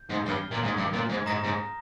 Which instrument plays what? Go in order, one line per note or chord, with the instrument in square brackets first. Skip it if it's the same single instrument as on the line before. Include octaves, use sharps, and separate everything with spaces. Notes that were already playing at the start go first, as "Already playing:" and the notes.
Already playing: [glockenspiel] G6
[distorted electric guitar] G#2
[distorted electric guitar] G2 [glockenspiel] F6 C7 G7
[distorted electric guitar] A#2
G#2
G2
A#2
G#2
[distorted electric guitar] G#2 [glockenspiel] A#5 D#6 A#6
[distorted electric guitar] G#2